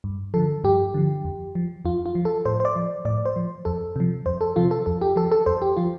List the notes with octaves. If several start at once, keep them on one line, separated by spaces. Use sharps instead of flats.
G2
D3 F3 A4
G2 G4
D3 F3
F2
F3
F2 F4
F4
F3
A4
A2 C5
C5
D5
F3
A2 D5
C5
F3
F2 A4
C3 F3
F2 C5
A4
C3 F3 F4
A4
F2 A4
G4
F3 A4
A4
F2 C5
G4
F3 F4